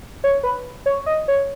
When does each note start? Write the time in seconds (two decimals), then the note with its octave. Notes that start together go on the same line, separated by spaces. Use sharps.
0.24 C#5
0.43 B4
0.86 C#5
1.06 D#5
1.28 C#5